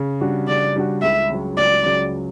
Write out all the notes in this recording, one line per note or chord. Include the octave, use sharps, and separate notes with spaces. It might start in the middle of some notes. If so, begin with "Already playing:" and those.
Already playing: C#3
G3 D4 F#4
C#3 D5
G3 D4 F#4
C#2 E5
C#3 F#3
C#2 D5
C#3 F#3